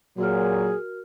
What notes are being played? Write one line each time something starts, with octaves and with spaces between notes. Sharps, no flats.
A#2 F#3 F#4 G#4 A#4 F6